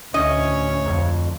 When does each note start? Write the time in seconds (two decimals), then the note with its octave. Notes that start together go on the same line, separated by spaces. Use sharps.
0.14 D2 A2 C#4 C#5 D#5
0.86 F2